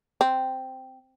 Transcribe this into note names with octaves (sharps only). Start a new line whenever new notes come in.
C4